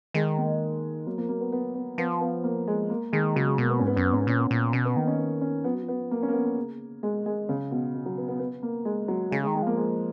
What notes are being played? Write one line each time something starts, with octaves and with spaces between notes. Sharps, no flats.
D#3 G#3
A#3
F#3 A#3
F3 A#3
F#3 A#3
B3
B3
B3
F3 B3
B3
A#3
G#3
A#3
D#3 G#3
C#3 F#3
G#3
B2 A#3
B3
G#2 C#4
B3
F#2 C#4
B3
G#2 C#4
B3
A#2 C#4
B3
A#2
B2 C#4
B3
D#3 A#3
C#4
B3
C#4
F3 B3
F#3
F3
B3
F#3
F3
F#3 A#3
F3 C#4
F#3 A#3
B3
F3
A#3
C#3
B2 G#3
D#3 G#3
C#3 F3
F#3
B2 F3
B2
F#3
B3
B3
A#2 B3
A#3
G#3
F#3
C#3 G#3
G#3
D#3
G#3
F3 A#3
G#3